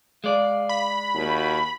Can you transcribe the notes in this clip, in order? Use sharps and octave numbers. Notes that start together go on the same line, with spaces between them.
G#3 D5 F5
B5
D#2 F#4